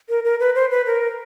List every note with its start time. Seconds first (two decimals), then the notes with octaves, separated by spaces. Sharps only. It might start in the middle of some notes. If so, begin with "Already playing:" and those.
0.09 A#4
0.25 A#4
0.40 B4
0.55 C5
0.71 B4
0.86 A#4